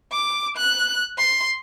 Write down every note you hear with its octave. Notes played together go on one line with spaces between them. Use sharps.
D6
F#6
C6